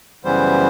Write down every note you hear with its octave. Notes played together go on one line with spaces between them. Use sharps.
F#2 C#3 E3 G3 B3 C5